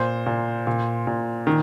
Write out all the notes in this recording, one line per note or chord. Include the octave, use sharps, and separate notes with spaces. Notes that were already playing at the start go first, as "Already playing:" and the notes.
Already playing: A#2 C5
A#2
A#2
A#2
D#3